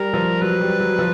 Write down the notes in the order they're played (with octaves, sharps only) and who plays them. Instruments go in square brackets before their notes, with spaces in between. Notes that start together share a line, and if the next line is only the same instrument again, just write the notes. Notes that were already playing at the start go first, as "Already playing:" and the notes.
Already playing: [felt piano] G3 [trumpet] A#4
[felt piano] F3
[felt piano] F#3 [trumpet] B4
[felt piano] G3
F#3
F3